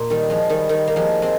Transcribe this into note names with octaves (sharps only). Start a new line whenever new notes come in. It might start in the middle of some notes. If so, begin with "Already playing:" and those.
Already playing: A#2
D#3 G3
F3 G#3
D#3 G3
D#3 G3
A#3
F3 G#3
G#3 C4